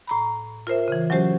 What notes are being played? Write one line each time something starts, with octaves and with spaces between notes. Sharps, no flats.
A2 A#5 B5
F4 A#4 C5 E5
C#3 E3
F#3 G#3 C#4 F#4 G4 C5